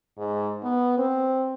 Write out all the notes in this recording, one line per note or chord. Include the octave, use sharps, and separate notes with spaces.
G#2
B3
C4